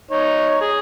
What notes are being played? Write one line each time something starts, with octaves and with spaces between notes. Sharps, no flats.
D#4 C#5
G#4